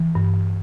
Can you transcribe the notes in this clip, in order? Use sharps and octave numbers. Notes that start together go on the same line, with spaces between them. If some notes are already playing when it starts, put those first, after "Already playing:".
Already playing: E3
G2